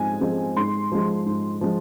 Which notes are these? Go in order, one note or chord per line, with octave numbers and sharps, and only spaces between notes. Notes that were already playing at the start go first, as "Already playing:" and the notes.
Already playing: G#2 F3 G#3 C4 G#5
F3 G#3 C4
G#2 C6
F3 G#3
G#2
F3 G#3